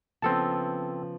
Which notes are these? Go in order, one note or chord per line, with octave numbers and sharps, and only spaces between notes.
C#3 F3 B3 C4 A4 A5